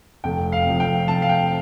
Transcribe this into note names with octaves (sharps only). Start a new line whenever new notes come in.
F1 G5
F5
F2 C3
G5
F1 A5
F5
G5